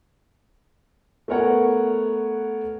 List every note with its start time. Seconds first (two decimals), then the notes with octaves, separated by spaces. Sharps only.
1.28 A3 B3 A#4 C#5 F#5